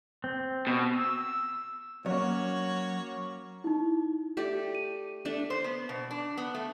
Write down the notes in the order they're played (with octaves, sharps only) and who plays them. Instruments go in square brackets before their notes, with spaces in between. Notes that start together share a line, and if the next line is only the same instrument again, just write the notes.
[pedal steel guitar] C4
[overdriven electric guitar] B2
[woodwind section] E6
[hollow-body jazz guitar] F#3 [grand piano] A#3 C#4 [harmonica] F#4 C#5
[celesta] D#4 E4
[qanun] A3 G4 D5
[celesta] D#7
[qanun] A3 D4
[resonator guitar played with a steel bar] C5
B3
B2
D4
B3
A3